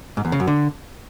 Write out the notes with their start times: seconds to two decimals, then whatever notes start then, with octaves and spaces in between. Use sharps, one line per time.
0.17 G#2
0.25 E2
0.32 C#3
0.40 F#2
0.47 D3